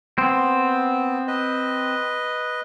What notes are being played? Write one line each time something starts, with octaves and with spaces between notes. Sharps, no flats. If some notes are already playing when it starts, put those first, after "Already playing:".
B3 C4
B4 D#5